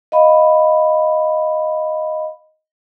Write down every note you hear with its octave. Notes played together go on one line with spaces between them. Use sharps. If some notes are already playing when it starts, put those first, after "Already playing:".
D#5 F5 B5